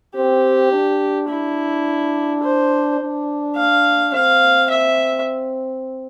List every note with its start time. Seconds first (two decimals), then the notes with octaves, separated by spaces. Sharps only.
0.15 C4 G4
0.73 D4
1.29 E4
2.43 C5
3.00 D4
3.57 F5
4.13 C4 F5
4.70 E5